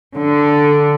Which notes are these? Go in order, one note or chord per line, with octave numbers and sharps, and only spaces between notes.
D3